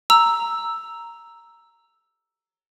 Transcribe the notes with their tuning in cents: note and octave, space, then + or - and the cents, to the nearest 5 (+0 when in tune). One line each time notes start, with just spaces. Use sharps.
A#5 +0 E6 +0